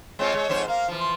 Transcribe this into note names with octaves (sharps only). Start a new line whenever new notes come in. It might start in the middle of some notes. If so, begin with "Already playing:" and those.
G#3 C4 F4 C#5
G#3
F2 G#2 C5
A#3 F5
E3 F3
C6